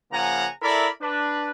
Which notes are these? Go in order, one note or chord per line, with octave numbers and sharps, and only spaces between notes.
C#3 F3 A#3 F#5 G#5 A#5
E4 A4 A#4 D5 E5 B5
D4 B4